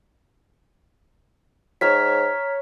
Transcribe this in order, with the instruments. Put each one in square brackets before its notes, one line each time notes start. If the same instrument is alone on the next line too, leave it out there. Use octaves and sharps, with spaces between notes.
[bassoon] G#2 [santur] C#5 C#6 E6 [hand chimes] A#5 F6 B6